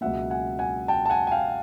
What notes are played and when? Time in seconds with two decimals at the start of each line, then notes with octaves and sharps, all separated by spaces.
0.01 C#2 B2 F#3 A#3 E5 F#5
0.30 F#5 G#5
0.59 F#5 G#5
0.88 G5 A5
1.05 A5
1.10 F#5 G#5
1.27 G#5
1.31 F5 G5